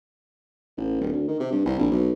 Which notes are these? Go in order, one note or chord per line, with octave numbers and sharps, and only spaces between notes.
A1
D1
D2
D#3
C3
G2
C2
A#1
B1